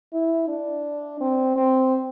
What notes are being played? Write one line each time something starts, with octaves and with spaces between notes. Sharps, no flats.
E4
D4
C4
C4